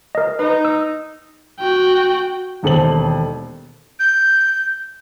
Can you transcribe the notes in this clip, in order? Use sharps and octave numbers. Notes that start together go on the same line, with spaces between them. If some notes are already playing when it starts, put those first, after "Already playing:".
A#4 D#5
D#4 B4
E6
F#4 G5
E1 D#2 A4 C5 F#7
G6